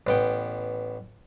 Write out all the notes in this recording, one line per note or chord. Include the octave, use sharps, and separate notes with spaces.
A1 B3 G5